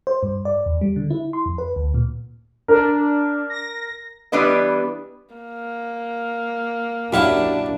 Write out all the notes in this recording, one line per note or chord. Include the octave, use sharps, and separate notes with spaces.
C5
G2
D5
E2
G3
D3
E4
C6
F2
B4
D2
A#2
D4 A#4
A#6
E3 G3 B3 D4 B4 D#5
A#3
F#2 D4 E4 G4 F5 F#5